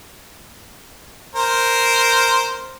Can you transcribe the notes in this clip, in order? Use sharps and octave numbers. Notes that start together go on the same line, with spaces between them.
A#4 C5